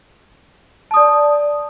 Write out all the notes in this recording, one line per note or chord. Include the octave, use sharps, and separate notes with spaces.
D5 A5 D#6